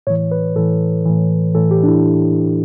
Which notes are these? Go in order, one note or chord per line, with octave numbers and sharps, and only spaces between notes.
A2 E3 C#5
B4
A2 E3 A4
A2 E3
A2 E3 A4
G4
D4
E4